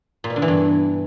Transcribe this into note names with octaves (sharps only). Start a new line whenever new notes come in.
A#2
B2
D3
E3
G2